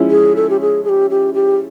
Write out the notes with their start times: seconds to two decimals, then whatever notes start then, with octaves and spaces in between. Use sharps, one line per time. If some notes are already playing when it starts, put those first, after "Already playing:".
Already playing: F3 G#3 C#4 E4
0.10 G#4
0.36 A4
0.49 G4
0.61 G#4
0.84 G#4
0.89 G4
1.10 G4
1.34 G4